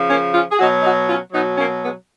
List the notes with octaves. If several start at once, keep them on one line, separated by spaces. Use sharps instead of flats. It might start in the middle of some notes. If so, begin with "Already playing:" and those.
Already playing: C#3 F3
A#3 C#4
C#4 F4
G#4
B2 F#3 D#4 F#4
D#4 F#4
C#4 F4
B2 F#3 B3 D#4
A#3 C#4
G#3 B3